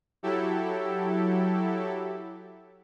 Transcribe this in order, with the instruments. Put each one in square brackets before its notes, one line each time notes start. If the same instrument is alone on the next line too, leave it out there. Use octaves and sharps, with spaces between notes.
[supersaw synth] F#3 E4 G4 A4